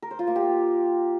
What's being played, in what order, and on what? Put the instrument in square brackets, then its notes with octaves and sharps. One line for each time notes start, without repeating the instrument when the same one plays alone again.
[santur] A#4
C5
F4
A#3
G4